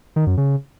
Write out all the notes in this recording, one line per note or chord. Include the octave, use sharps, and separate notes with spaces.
D#3
F#2
C#3